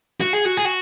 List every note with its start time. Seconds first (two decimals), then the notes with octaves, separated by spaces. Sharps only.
0.21 F#4
0.33 G#4
0.45 F#4
0.57 G#4
0.65 F#4